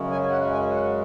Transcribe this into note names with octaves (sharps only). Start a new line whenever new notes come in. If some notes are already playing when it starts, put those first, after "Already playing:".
Already playing: F#2 C#3 G#3 C#4
G#5
F#5
G#5
F#5